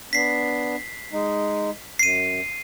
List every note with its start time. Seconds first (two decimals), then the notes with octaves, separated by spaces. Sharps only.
0.13 B3 D4 B6 C7
1.13 G#3 D#4
1.99 F#2 C7 D#7